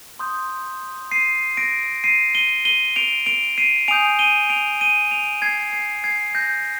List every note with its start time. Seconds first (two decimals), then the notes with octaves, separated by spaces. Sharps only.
0.19 C6 D#6 G6
1.11 C7 D#7
1.57 A#6 D7
2.04 C7 D#7
2.35 D#7 G7
2.65 D#7 G7
2.96 D7 F7
3.26 D7 F7
3.58 C7 D#7
3.88 G#5 D#6 G6 D7 F7
4.19 D#7 G7
4.50 D7 F7
4.81 D#7 G7
5.11 D7 F7
5.42 G#6 C7
5.73 G#6 C7
6.04 G#6 C7
6.35 G6 A#6